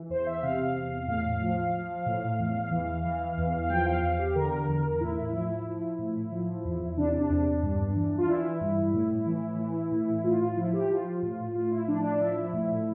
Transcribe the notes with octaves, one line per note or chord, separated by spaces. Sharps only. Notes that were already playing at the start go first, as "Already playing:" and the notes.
Already playing: E3
E2 C5
E5
C3 F5
E2
A2 F5
F3
F3
A2
E2
E3
E3
E2
F5
F3 G5
F5
E2 F5
G4
D3 A#4
E2
A2 E4
E4
F3 E4
E4
F3
A2
F3
E2
C3 D4
D4
E2
G2
E3
F4
E3 E4
G2
A2
E3
E3
A2
A2 F4
F4
F3 E4
G4
F3 F4
A2
A2 F4
E4
F3 D4
D4
F3 E4
A2